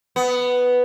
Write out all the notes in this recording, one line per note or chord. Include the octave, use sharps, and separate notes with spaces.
B3